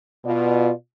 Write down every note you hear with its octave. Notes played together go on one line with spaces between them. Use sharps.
B2 F4 D5